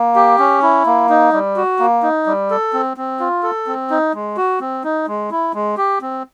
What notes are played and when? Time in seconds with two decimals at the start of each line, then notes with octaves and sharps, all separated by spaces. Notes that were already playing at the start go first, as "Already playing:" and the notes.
Already playing: A#3
0.15 G4
0.39 C#4
0.63 E4
0.86 A#3
1.09 D#4
1.33 G3
1.56 F#4
1.79 A#3
2.03 D#4
2.26 G3
2.50 A4
2.73 C4
2.97 C4
3.19 F4
3.43 A4
3.67 C4
3.90 D#4
4.14 G#3
4.37 F#4
4.61 C4
4.84 D#4
5.07 G#3
5.31 E4
5.54 G#3
5.77 G4
6.01 C4